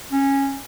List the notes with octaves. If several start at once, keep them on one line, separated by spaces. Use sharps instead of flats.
C#4